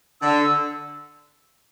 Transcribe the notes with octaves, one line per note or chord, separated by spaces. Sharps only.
D3 E6